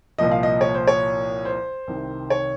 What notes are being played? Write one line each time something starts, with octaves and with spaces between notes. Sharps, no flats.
C2 A#2 F3 D#5
F5
D#5
C#5
C5
C#5
C5
C2 C3 D#3
C#5